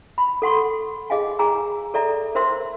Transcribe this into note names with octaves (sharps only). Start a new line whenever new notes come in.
B5
A4 F#5 C6 C#6
G#4 D#5 F5 G#5
G#4 G#5 A#5 E6
A4 D5 E5 A#5
A#4 C5 E5 C6 E6